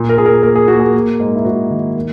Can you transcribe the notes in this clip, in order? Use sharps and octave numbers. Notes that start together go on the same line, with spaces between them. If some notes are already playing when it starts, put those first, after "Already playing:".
Already playing: A#2
A#4
A#2 G#4
A#4
A#3 A#4
G#4
A#3 F#4
G#4
A#3
G#2
E4
G#2 F#4
D#3
A#3